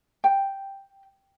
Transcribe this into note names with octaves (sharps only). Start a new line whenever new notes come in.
G5